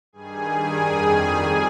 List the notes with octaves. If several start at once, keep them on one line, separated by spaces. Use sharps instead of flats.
G2 D#3 G3 G#4 G#5
F2 D#3 G3